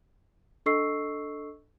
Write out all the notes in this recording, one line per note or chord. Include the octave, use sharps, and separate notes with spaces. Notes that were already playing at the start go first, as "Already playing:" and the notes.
D4 A4 D#5 C#6 E6 C7